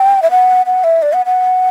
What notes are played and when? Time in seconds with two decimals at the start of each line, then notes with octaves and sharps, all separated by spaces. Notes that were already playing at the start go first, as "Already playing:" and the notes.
Already playing: G5
0.23 E5
0.31 F#5
0.66 F#5
0.84 E5
1.02 D5
1.13 F#5
1.26 F#5